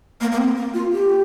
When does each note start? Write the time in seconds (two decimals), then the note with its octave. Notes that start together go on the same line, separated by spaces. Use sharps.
0.21 A#3
0.32 A#3
0.38 C4
0.57 A#3
0.74 F4
0.92 G4